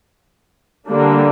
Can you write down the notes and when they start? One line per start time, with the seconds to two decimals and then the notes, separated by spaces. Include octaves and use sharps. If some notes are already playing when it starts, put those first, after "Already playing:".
0.88 D3 G3 A#3 D4